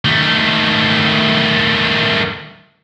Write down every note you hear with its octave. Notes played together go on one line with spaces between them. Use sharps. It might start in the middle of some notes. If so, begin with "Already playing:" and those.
D#3 A3